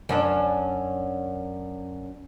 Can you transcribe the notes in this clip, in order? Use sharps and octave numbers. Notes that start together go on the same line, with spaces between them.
F#2 C#4 D4